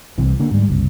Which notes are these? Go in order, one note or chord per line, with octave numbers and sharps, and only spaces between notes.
C2 C3 E3
D3 A#3
G#2 G3
F#1 C2